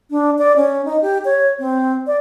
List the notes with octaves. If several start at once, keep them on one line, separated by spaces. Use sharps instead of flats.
D4
D5
C#4
D#4
G4
C#5
C4
D5